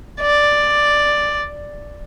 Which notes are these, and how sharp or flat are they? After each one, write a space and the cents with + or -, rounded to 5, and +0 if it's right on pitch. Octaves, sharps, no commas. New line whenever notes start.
D5 +5